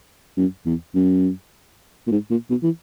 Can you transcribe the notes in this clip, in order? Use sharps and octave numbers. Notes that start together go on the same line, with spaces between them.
F#2
E2
F#2
A#2
G#2
A#2
B2
E3